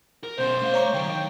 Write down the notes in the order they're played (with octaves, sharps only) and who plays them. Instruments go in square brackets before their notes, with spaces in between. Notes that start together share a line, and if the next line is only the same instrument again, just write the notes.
[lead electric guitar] A#4
[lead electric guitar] B2 C#4 [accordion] C5
[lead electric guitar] A3 F5
[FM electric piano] C#5 A#5 C#6
[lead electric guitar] D3 F#3 [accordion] G5
[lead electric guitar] D#3